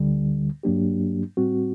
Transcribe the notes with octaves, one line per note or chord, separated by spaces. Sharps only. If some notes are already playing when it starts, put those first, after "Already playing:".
Already playing: D2 D3 G3
G2 F#3 A#3 D4 G4
A2 G3 C4 F#4